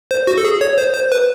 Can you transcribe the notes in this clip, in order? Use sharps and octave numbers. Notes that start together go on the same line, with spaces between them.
C5
F#4
A4
G#4
C#5
C5
C5
B4